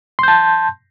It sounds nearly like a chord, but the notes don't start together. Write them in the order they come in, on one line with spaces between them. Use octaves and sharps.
C6 G6 A5